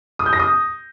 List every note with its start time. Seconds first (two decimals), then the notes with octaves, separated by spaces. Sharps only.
0.19 D#6
0.26 G6
0.33 A#6
0.40 D#6